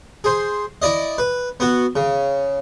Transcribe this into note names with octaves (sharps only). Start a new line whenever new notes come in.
G#4 C5
E4 D5 D#5
B4
B3 F#4
C#3